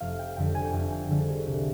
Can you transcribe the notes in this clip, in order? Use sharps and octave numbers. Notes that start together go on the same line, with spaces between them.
F1 F5
G5
F2 D3 G3 G5
G#5
G5
F1 G#5
G5
F2 D3 G3 G#4
G#4
C2 G4